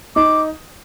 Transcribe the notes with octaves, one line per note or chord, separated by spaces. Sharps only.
D#4 D6